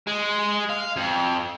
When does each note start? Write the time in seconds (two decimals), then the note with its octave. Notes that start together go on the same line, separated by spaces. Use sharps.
0.07 G#3
0.70 F5
0.97 F2